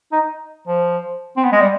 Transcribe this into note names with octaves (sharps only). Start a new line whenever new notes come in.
D#4
F3
C4
B3
G#3
G3